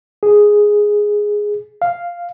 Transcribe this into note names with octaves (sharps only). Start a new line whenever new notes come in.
G#4
F5